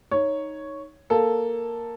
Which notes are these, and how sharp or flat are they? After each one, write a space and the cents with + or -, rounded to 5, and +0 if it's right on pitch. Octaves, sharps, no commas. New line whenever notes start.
D#4 +0 C#5 +0
A#3 +0 A4 +0